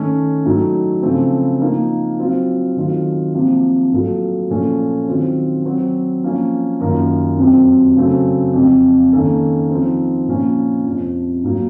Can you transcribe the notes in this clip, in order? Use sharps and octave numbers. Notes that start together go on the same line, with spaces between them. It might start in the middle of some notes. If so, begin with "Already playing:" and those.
Already playing: D#3 A3 C#4 A4
A2 F#3 A3 D#4
C#3 F3 A3 C4
F3 A#3 D#4 A#4
F#3 C4 F4
D#3 F#3 A3 C4 F4
C3 F3 A#3
A2 F#3 A#3 F4 A4
A#2 F3 A3 C#4 A4
D#3 F#3 C4 F4
F#3 C4 F#4
F3 A#3 C#4
F#2 D#3 A#3 F4 A#4
F2 C3 F#3 C4
C#3 F#3 A3 C4
F2 C3 F3
D#3 A#3 C#4 A4
F3 C4 D#4
A#2 F3 A#3 C#4
F2 C3 F3
A2 F#3 A#3